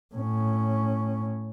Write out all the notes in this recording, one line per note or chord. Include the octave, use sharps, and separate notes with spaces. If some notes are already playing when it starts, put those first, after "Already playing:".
A2 C#4